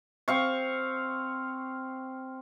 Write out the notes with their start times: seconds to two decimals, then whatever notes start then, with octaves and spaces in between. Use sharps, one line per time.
0.28 C4 F5 C#6